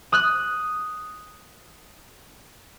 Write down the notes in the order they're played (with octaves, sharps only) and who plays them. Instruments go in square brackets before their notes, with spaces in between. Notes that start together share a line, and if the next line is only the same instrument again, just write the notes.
[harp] D#6 F#6